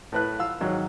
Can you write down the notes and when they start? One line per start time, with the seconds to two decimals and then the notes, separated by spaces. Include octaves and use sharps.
0.12 A2 B4 F#6
0.39 F4 F5 E6
0.61 G#2 D#3 F#3